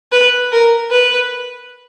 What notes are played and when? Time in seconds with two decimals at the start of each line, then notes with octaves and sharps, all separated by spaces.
0.12 B4
0.52 A#4
0.91 B4